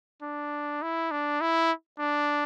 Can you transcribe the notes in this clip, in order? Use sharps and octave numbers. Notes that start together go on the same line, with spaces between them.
D4
E4
D4
E4
D4